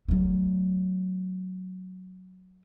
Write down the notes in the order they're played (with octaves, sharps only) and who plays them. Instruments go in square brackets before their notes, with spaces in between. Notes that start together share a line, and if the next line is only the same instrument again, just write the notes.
[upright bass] F#3 A3